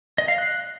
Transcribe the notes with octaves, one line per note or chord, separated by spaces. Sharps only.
D#5
F5
F#6